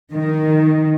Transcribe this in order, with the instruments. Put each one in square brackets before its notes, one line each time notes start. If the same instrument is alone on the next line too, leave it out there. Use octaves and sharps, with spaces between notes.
[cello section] D#3